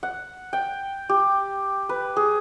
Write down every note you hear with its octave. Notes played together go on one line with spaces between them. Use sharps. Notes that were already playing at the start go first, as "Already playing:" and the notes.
F#5
G5
G4
B4
G#4